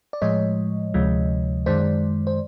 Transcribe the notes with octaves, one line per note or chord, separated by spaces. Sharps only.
D5
A2 F3 G#3 C#5 D#5
D2 C3 F3 G#3
F#2 D#3 G#3 C5 D5
C5